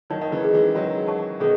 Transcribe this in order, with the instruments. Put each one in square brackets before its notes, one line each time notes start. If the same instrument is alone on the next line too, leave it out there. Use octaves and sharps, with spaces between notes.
[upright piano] D#3 F#3 [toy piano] D#4
[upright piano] D#3
C#3 E3
[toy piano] G#4 D#5
[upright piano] E3 G#3
[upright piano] D#3 F#3 [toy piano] F#4
[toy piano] C#5 F#5 A5 C#6
[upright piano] B2 D#3 [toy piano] G#4